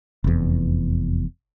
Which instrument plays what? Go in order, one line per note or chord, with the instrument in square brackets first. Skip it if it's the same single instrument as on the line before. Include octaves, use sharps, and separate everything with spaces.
[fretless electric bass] F1 E2